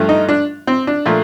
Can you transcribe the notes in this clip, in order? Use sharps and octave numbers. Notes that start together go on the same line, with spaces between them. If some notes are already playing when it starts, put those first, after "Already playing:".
Already playing: G2 F3 A3
D#4
D4
C4
D4
A#2 F3 A3